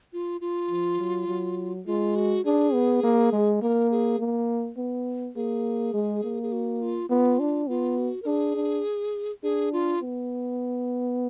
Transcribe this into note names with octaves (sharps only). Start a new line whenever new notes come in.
F4
F4
F3
F#3
F#3
G#3 F4
F#4
D4 G#4
B3
A#3
G#3
A#3 A#4
G#4
A#3
B3
A#3 G#4
G#3
A#3
G#4
F#4
F4
B3 F4
D4
B3 F4
F#4
A#4
D4 G#4
D4
D4 G#4
F4
B3